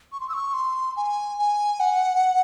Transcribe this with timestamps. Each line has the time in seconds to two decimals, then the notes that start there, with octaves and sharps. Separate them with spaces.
0.12 C#6
0.20 C6
0.29 E6
0.34 C#6
0.54 C6
0.97 G#5
1.39 G#5
1.80 F#5